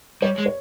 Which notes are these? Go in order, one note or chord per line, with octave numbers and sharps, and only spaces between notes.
G3 C#5
G#3
C#5